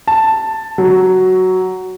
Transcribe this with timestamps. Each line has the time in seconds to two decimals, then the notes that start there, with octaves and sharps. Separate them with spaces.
0.07 A5
0.78 F#3